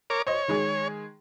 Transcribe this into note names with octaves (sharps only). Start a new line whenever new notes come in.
A#4 C#5 D6
C5 C#5 D#5
D#3 G#3 G#4